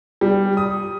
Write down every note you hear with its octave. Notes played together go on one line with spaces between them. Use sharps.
G3
D#6